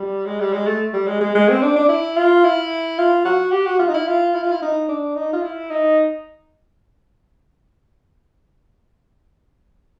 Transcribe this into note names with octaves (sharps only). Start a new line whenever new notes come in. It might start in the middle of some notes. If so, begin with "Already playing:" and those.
Already playing: G3
G#3
G3
G#3
A3
G3
G#3
G#3
G#3
C4
D4
D4
E4
F4
E4
F4
F#4
G4
F#4
F4
D#4
E4
F4
E4
F4
E4
D#4
D4
D#4
F4
E4
D#4